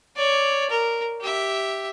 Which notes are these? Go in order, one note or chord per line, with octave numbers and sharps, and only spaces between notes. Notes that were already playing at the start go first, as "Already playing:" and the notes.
C#5 D5
A#4
G4 E5